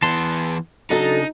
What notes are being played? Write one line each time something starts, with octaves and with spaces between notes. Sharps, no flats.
E3 B3 A5 C6
C#3 F#3 D4 D#4 A4 D#5 A5